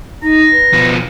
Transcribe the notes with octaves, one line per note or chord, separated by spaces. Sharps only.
D#4 A#5
B4
B2 F3